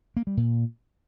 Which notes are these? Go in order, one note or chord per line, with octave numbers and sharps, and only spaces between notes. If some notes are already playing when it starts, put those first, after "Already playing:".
A#3
G3
A#2